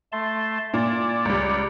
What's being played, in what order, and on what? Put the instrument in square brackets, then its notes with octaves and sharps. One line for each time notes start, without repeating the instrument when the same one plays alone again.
[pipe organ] A3 A5 C6
[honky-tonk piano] A#2 [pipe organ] D5
[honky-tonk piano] C#2 G3